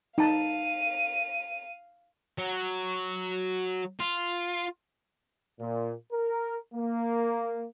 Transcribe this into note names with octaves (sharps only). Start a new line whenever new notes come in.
D#4 F5 A5 D#7
F#3
F4
A#2
A#4
A#3